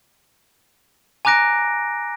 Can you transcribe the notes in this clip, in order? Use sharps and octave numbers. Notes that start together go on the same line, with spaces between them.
G#5 A#5 D6 F#6 A#6 D7